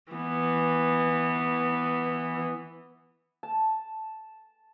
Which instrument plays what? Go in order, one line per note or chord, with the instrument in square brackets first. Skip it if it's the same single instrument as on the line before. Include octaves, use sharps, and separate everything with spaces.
[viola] E3 B3
[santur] A5